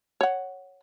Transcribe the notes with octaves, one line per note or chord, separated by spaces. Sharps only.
C#5 F#5